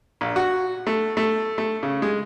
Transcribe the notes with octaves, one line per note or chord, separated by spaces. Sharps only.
A#1
F#4
A3
A3
A3
C#3
G#3